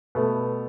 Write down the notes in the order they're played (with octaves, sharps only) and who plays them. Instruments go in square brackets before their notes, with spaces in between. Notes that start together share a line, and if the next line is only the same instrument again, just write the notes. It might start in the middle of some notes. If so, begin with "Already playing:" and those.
[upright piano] B2 A3 B3